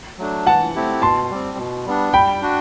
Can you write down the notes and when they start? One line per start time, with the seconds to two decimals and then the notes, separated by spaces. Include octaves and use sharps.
0.18 F#3 A3 D4
0.46 E3 F#5 A5
0.75 A3 C4 E4 G4
1.02 B2 A5 C6
1.30 G3 C4
1.58 B2
1.86 G3 B3 D4
2.13 G3 G5 B5
2.42 D4 F#4